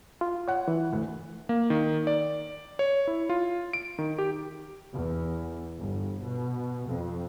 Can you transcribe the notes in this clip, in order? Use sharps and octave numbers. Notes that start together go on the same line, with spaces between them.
F4
C#5 F#5
E3
D2
A#3
D#3
D5
C#5
E4
F4
D7
D#3
G4
E2
G1
B2
F2